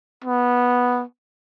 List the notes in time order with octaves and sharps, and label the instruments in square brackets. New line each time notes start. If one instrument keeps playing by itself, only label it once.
[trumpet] B3